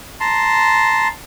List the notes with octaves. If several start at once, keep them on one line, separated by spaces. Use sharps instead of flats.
A5 A#5 C6